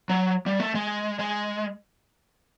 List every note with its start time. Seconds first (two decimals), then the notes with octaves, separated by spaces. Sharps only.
0.10 F#3
0.46 G3
0.60 A3
0.75 G#3
1.19 G#3